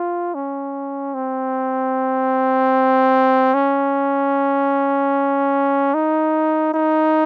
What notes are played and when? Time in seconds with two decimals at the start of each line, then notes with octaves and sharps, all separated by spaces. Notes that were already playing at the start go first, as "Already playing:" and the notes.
Already playing: F4
0.35 C#4
1.15 C4
3.54 C#4
5.94 D#4
6.74 D#4